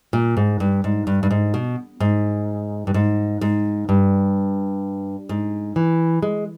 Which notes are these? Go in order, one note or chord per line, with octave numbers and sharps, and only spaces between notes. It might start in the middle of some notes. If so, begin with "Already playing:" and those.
A#2
G#2
G2
G#2
G2
G2
G#2
B2
G#2
G2
G#2
G#2
G2
G#2
E3
G#3